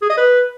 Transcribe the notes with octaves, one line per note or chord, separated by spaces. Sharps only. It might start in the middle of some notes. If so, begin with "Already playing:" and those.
G#4
D#5
B4